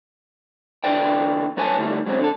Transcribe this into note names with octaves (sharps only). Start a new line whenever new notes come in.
E2 D3 B4 D5 G5
F#3 B3 B4 C#5 G#5 A5
A2 D3 G3 D#4
F#3 G#3 C4 C#4
D3 A4